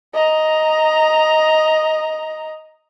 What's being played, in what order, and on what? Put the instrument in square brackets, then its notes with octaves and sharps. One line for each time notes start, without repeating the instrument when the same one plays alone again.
[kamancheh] D#5 A#5